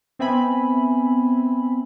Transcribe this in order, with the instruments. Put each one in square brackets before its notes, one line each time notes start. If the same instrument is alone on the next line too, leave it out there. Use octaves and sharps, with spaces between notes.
[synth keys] B3 C4 E5 G#5 B5